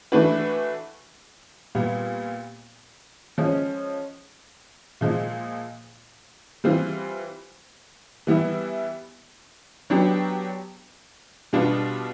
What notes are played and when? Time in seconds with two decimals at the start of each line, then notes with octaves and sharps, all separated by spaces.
0.12 E3 A3 D4 F#4 B4
1.75 A#2 G3 B3
3.38 F3 G#3 C#4
5.01 A#2 F3 G#3
6.64 E3 G3 C4 F4
8.27 E3 G3 B3 E4
9.90 F#3 B3 D4 G4
11.53 B2 G3 B3 D4 F4